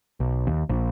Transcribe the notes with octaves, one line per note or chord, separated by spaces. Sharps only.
B1
D#2
A#1